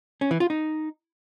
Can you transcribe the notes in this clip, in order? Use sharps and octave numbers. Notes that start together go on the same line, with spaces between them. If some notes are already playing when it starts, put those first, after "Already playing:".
C#4
E3
F4
D#4